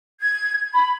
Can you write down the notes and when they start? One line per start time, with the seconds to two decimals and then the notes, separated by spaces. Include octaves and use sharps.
0.20 G#6
0.73 B5